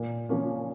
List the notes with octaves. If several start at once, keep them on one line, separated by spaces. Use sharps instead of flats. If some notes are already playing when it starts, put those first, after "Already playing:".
Already playing: A#2
F3 A#3 C#4